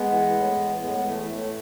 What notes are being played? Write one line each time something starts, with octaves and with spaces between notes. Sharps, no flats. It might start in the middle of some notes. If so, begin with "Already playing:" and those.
Already playing: G#3 B3
E3
A2
E3
A2 G#3 B3
G#3
E3 A3
A2 A3